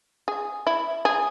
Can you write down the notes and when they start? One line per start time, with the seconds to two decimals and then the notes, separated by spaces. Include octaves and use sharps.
0.28 G#4
0.67 E4
1.05 G#4